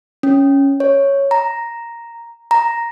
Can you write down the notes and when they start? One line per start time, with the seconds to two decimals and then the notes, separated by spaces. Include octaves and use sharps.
0.23 C#4
0.80 C#5
1.31 A#5
2.51 A#5